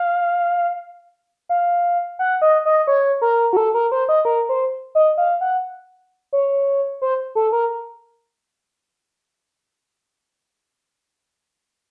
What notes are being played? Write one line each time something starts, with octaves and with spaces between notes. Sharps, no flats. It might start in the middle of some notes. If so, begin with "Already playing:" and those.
Already playing: F5
F5
F#5
D#5
D#5
C#5
A#4
F#4
A4
A#4
C5
D#5
A#4
C5
D#5
F5
F#5
C#5
C5
A4
A#4